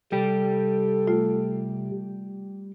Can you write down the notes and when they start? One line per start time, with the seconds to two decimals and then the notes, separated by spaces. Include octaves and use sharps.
0.12 C3 G3 G4 A4
1.08 A3 F4